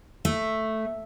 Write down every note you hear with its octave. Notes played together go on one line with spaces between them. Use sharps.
A3